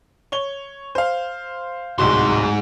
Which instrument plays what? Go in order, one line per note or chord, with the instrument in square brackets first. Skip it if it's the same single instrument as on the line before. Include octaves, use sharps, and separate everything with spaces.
[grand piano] C#5 G7
C5 F5
[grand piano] D1 C2 F#4 [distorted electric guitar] G#2 C6